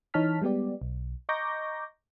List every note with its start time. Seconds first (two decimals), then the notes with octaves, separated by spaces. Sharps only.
0.14 E3 D#4 C#5 A5 F6 B6
0.42 G3 G#3 B3 G4 D5
0.82 B1
1.29 D#5 A#5 C#6 D6 G6 A#6